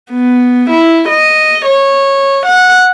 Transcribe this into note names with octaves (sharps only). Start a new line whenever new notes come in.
B3
E4
D#5
C#5
F#5